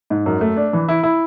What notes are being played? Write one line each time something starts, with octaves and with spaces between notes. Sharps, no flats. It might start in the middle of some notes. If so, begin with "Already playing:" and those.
G#2
F#2
A3
D4
E3
E4
E4